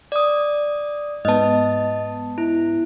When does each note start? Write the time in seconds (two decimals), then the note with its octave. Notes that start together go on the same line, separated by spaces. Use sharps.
0.12 D5 D#6
1.25 G#2 B3 D#5 A5
2.38 E4